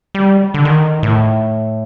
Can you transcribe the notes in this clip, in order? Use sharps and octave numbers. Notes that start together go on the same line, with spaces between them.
G3
D3
D#3
A2